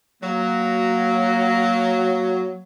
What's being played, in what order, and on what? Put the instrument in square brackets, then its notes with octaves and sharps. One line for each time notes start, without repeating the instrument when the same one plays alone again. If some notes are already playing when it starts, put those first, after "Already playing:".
[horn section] F#3 [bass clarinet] A#3